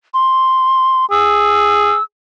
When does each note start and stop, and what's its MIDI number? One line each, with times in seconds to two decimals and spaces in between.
0.14 1.06 84
1.11 1.95 68
1.11 2.03 88